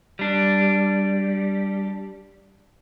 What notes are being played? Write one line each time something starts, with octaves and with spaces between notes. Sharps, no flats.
G3 D4